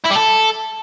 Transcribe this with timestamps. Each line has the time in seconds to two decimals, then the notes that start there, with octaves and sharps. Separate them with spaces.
0.04 E4
0.10 G3
0.15 A4